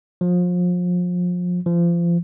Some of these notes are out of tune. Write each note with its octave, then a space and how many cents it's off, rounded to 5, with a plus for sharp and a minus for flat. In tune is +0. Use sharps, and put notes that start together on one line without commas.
F3 +30
F3 -30